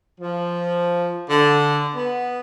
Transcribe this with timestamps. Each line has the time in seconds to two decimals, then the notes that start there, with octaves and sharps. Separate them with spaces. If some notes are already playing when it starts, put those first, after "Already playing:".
0.20 F3
1.30 D3
1.95 B3